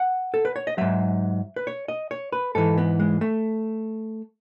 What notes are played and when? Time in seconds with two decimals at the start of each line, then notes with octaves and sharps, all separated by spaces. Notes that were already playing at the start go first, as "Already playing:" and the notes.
Already playing: F#5
0.34 A4
0.45 B4
0.56 C#5
0.67 D#5
0.78 G#2 F#3 E5
1.56 B4
1.67 C#5
1.88 D#5
2.11 C#5
2.33 B4
2.55 G#2 E3 A4
2.77 B3
3.00 G#3
3.21 A3